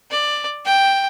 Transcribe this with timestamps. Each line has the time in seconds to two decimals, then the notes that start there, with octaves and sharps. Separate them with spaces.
0.11 D5
0.66 G5